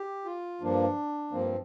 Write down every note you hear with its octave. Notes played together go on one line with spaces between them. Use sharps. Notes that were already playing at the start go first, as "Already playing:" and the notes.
Already playing: G4
F4
G2 F3 A#3 D4
G2 F3 A#3 C4